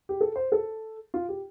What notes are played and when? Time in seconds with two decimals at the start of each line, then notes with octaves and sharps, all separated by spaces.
0.09 G4
0.21 A4
0.36 C5
0.52 A4
1.14 F4
1.29 G4